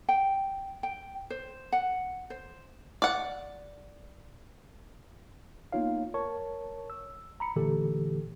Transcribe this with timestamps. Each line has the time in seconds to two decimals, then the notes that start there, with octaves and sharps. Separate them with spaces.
0.09 G5
0.83 G5
1.30 C5
1.72 F#5
2.30 C5
3.02 D5 F#5
5.72 A#3 B3 D#4 F4 C#5 F5
6.14 A#4 C#5 A5 C#6
6.90 E6
7.40 A#5 B5 C#7
7.56 A#2 D3 E3 A3 G4 A4